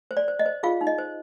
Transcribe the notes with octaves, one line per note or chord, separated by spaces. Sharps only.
C5
D5
C5
D#5
C5
F4 G#4 F5
D#4
D#5
C5